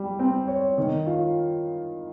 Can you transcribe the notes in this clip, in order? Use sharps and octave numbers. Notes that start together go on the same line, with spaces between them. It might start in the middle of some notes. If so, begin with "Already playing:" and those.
Already playing: G3
C4
C#5
D#3
F4